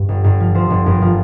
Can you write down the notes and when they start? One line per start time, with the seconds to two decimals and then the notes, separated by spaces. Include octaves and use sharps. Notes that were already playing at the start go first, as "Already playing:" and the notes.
Already playing: G2
0.09 G1
0.24 G1
0.40 F3
0.55 F3 C5
0.70 G1
0.86 G1 A#4
1.02 F3